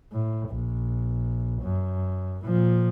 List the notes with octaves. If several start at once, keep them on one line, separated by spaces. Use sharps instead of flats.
A2
A#1
F#2
A#2 F3